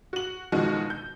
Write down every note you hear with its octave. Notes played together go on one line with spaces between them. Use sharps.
F#4 F#7
G1 B2 D#3 F3 G#3 F#4
G6